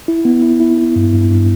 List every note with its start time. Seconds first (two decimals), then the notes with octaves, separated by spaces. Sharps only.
0.08 E4
0.25 B3
0.42 E4
0.60 E4
0.78 E4
0.96 G2
1.13 G2
1.31 G2